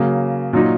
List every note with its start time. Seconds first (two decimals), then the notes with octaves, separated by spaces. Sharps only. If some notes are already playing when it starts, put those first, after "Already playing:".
Already playing: C#3 F#3 A#3
0.53 A#2 F#3 D#4